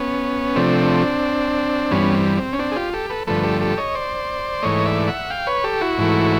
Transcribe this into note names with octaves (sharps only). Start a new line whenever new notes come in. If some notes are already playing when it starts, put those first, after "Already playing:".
Already playing: B3 C#4
C3 F3 A3 C4 D4
G2 E3 G3 B3 C#4
C4
C4
C#4
C4 D4
G#4
F4 G4
G4 A4
A4 B4
G2 D3 F3 A3 A4 B4
G4 A4
G4 A4
C#5 D#5
C5 D5
G#2 E3 A3 C#5 D#5
D5 E5
E5 F#5
F5 G5
B4 C#5
G4 A4
E4 F#4
G#2 E3 A3